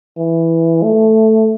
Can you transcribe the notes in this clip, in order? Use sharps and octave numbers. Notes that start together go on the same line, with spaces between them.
E3
A3